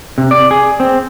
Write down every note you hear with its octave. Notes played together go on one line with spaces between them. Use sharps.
C3
D5
G#4
C4